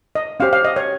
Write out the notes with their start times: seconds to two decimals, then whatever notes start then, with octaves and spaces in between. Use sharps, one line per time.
0.15 D#5
0.40 C#4 G4 C5 F5
0.53 F5
0.65 D#5
0.76 C#5